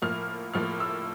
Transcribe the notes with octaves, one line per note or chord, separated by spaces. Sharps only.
A2 F3 A#3 F6
A2 F3 A#3 F6
E6